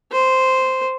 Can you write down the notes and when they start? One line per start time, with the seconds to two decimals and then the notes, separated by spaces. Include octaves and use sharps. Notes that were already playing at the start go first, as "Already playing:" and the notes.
0.12 C5